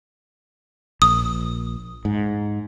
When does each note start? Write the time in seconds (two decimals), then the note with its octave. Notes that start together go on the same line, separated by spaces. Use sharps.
1.02 A#1 D#6
2.05 G#2